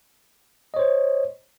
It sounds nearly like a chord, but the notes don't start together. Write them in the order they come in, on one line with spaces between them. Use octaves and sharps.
D#5 C#5 C5